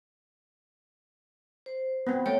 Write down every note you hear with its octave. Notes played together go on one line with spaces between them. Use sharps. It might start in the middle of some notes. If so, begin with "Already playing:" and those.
C5
B3 C4
A3 C#5 G5